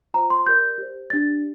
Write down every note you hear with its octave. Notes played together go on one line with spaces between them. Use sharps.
F4 C5 A#5
C6
G4 A#4 D5 G6
G4 C5
D4 G4 D5 A6